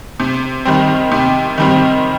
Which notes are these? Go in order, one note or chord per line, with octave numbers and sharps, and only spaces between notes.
C3
D#3 G3 C4
C3
D#3 G3 C4